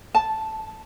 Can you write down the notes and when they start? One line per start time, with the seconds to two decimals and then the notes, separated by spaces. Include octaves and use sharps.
0.15 A5